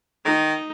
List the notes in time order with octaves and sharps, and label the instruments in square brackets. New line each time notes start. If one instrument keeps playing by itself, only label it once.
[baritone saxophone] D#3 [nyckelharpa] D#4